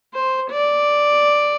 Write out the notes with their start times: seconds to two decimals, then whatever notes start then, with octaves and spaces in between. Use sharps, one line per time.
0.14 C5
0.51 D5